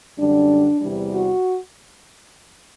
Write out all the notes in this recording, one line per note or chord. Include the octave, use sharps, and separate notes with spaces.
F#2 D3 G3 D4
E2 C3 E3 G3
F#4